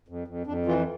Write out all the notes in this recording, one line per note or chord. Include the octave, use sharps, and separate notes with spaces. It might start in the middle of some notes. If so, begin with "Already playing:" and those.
F2
F2
F2 D4
E3 F4